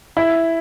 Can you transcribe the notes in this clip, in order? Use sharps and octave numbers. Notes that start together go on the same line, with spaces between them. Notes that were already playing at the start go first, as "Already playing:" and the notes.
E4